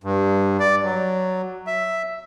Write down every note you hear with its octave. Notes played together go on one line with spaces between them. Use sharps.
G2
D5
F#3
E5